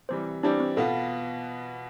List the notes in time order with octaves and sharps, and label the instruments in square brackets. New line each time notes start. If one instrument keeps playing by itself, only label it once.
[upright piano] C3 E3 G3 [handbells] C5
[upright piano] E3 G3 C4 G4 D5 [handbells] D4
[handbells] C4
[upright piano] B2 B3 F4 [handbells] A4